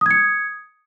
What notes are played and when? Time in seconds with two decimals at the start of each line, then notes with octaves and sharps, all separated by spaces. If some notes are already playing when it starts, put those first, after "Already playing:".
0.01 D#6
0.06 G#6
0.11 C#7